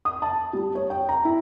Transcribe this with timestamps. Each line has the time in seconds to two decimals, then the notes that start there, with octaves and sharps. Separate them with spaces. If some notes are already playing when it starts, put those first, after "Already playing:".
0.05 D#6
0.22 A5
0.53 G3
0.75 C#5
0.90 G5
1.09 A#5
1.25 E4